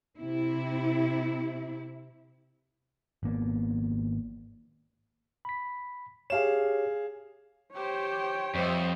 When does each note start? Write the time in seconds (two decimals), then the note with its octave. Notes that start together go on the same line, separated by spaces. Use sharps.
0.17 C3 E4
3.23 G#1 A#3 B3
5.45 B5 B6
6.30 G4 G#4 C#5 F5 E7
7.74 G4 C5 C#5 G5
8.55 F2 G3 C5 D#5 E5